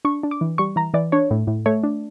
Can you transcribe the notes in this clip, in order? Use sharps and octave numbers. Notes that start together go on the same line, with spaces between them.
D4 C#6
D4
D6
E3
G3 C#6
E3 A#5
E3 D5
D4 C#5
A2
A2
A3 C#5
D4